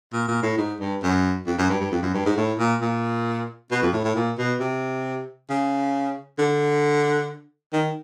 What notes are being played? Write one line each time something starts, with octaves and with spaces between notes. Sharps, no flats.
A#2
A#2
A2
G#2
G2
F#2
F2
F#2
G2
G2
F2
F#2
G2
G#2
A2
A#2
A#2
B2
F2
A2
A2
A#2
B2
C3
C#3
D3
D#3